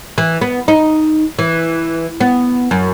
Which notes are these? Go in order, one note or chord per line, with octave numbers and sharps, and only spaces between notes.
E3
B3
D#4
E3
B3
F#2